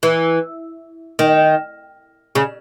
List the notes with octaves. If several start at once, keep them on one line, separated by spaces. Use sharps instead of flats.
E3
D#3
C#3